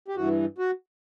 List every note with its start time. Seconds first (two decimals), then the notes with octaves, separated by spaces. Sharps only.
0.08 G4
0.16 G2 E3 F#4
0.58 F#4